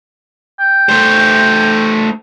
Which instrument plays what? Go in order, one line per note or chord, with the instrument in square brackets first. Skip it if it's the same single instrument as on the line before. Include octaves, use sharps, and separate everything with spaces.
[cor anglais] G5
[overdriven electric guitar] A3 C5